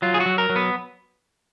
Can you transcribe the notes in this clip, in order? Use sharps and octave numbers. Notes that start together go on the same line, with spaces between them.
F#3 F4
G#4
F#4
F#3
A#4
F#3
B3